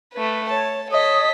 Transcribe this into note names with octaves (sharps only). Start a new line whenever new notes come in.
A3 B4
C#5 A5
A4 C#5 D#5 D#6 B6